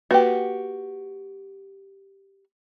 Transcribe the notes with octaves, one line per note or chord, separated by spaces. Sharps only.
A#3 F#4 G4 B4